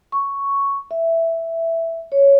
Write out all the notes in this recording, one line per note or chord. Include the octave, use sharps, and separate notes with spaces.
C#6
E5
C#5